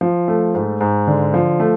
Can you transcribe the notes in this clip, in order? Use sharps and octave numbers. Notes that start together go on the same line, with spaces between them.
F3
A3
G#2
G#2
D3
F3
A3